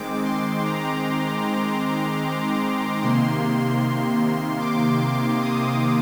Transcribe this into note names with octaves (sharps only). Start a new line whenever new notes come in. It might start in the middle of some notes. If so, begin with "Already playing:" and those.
Already playing: D#3 G#3 C4 D6
C6
A#5
C3 D#3 A#3 C6
D6
D#6